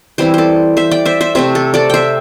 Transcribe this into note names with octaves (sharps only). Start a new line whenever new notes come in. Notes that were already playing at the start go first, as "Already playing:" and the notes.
E3 G3 C4 E4 G4 C5
A4 C5 D5
C5 E5
D5 G5
C5 E5
C5 E5
C3 A3 C4 C5 E5
A4
A4 D5
C5 E5 G5